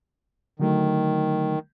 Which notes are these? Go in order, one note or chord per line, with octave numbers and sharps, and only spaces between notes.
D3 D#3 F#3 A3